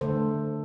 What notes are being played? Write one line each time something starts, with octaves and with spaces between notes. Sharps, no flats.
D3 A3 A4 C5